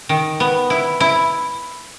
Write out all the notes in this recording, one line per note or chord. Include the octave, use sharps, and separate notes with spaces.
D#3
B3
E4
E4